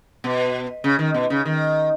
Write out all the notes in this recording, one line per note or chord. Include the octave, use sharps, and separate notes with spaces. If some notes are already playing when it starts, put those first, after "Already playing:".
B2
C#3
D#3
B2
C#3
D#3